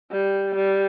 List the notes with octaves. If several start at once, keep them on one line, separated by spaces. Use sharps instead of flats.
G3
G3